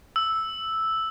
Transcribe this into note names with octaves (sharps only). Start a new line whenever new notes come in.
E6